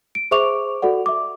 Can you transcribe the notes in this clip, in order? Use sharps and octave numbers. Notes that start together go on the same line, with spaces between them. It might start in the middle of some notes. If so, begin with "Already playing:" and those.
D7
G#4 C5 E5 C#6 D6 F7
F#4 A4 D5 F#5
E5 D6